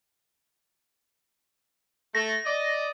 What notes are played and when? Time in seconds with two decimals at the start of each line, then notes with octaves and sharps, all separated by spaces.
2.15 A3 A#6
2.46 D5 D#5